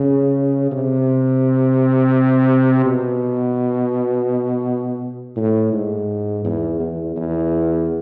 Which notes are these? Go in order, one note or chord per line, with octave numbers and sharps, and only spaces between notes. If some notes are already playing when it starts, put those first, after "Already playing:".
Already playing: C#3
C3
B2
A2
G#2
E2
E2
E2